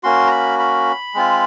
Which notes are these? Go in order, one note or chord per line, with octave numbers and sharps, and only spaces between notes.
A#3 C#4 F#4 C6
A#5
B5
B5
G#3 C4 F4